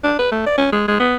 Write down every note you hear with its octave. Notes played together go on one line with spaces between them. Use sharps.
D4
B4
A3
D5
C#4
G#3
G#3
B3